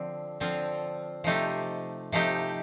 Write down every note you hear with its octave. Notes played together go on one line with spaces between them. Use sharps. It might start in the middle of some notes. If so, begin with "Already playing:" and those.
Already playing: D3 F3 C4
D3 F3 C4 F4
C3 F3 A3 D#4 G4
C3 F3 A3 D#4 G4